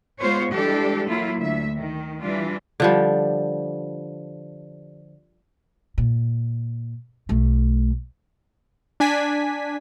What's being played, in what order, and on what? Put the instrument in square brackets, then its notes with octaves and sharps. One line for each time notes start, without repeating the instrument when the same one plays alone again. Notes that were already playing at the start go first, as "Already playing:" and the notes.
[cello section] G#3 B3 F4 C5 C#5
E3 G3 G#3 D4 G4 A4
F#3 A#3 E4 F4
D2 E5
D#3
E3 G3 D4 F4
[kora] D3 F3 G3
[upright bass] A#2
B1 A3
[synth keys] D4 G#5 B6